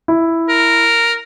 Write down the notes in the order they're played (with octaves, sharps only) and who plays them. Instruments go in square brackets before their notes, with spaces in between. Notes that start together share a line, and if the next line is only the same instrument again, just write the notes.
[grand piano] E4
[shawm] A#4